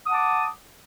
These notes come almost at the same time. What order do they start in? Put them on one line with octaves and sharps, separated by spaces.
D#6 F#5 A5 D6